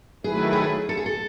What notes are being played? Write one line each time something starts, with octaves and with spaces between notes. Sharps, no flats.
D#3 F#3 A3 E4 G#4 B4
G#4
A4
G#4
A4